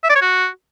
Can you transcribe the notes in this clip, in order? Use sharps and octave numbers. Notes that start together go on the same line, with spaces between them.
E5
D5
C#5
F#4